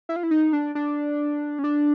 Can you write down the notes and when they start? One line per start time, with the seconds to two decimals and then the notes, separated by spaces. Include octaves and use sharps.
0.09 E4
0.16 F4
0.23 E4
0.31 D#4
0.53 D4
0.75 D4
1.59 C#4
1.64 D4